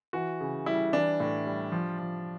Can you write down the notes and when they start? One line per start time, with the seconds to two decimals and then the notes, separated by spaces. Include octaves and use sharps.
0.13 E3 F#4
0.40 C#3
0.66 G3 E4
0.93 E3 D4
1.20 A2
1.46 G3
1.72 F3
1.99 F3